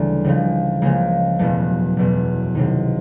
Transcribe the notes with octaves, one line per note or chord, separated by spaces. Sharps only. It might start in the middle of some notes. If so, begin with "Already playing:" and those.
Already playing: D2 C#3 E3 G3 A3
C#2 C#3 F3
C#2 C#3 F3 G#3 A#3
F#1 E2 B2 A3 B3
F#1 E2 B2
C#2 C3 D#3